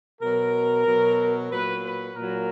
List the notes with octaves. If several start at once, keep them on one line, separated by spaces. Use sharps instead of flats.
B2 F#3 A#4
B2 F#3
A#2 F#3 B4
B4
A#2 F#3 A#4